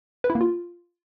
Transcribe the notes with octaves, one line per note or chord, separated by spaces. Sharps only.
B4
E4
A#3
F4